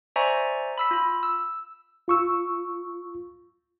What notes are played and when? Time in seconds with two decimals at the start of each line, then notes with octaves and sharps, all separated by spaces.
0.16 C5 D5 E5 G#5 A#5 C#6
0.78 B5 E6 B6
0.91 F4 B5
1.23 E6
2.08 F4 C#6 E6